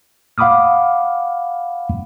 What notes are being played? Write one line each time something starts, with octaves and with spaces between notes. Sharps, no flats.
F5 F#5 B5 D6 D#6 F6